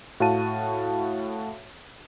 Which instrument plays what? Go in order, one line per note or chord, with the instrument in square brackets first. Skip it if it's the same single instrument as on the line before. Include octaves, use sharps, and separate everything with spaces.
[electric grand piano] A2 F#4 F5 A5 D#7